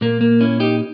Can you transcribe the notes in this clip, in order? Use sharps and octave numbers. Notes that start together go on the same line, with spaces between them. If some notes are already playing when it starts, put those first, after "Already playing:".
A#2 A#3
A#3
C#4 E4
D#4 G4